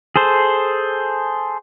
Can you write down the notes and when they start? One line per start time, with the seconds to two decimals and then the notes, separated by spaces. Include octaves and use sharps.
0.16 G#4 A4 C5